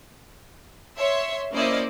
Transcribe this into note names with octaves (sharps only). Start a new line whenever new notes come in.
C#5 E5 C6
A#3 C#4 E4 C5 D5 D#5